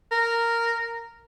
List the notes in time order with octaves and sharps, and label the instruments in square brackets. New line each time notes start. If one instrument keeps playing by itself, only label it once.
[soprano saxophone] A#4